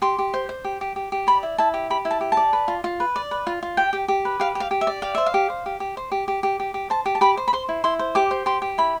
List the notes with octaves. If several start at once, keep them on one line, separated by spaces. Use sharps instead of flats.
G4 C6
G4
C5
C5
G4
G4
G4
G4
D5 B5
E4
E4 A5
G4
G4 B5
E4
A5
G4
A5
D5
B4
F4
F4
B4
D5
B4
F4
F4
G4 G5
G4
G4
B4
G4 F5
G4
F5
G4
E5
D5
G4 F5
C5 E5
F5
G4
C5
G4
G4
C5
G4
G4
G4
G4
G4
C5 A5
G4
A5
G4 B5
C5
B5
C5 C6
E4
E4 C6
C5
G4 D6
C5
G4 C6
G4
E4 B5